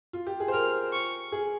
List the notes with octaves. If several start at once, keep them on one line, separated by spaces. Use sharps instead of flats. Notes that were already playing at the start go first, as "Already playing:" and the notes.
F4
G4
G#4
C5
A#4 F6
C#6
G#4